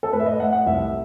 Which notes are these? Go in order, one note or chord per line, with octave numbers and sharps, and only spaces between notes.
A4
A2 B4
E5
D#5
A2 F#5
F#5
C2 E5